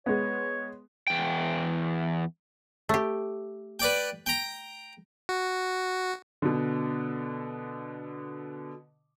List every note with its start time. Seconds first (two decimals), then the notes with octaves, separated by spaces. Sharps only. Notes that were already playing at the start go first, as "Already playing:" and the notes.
0.06 G#3 B3 C#5
1.07 E2 G5
2.89 A3 G4
3.80 B4 D5 G5
4.26 G5 A#5
5.29 F#4
6.42 B2 D3